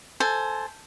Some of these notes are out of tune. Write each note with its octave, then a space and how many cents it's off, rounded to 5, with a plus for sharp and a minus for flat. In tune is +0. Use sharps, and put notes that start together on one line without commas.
A4 +0 C5 +0 G#5 +20